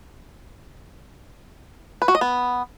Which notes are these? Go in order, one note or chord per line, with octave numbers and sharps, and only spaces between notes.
B4
F#4
D#5
B3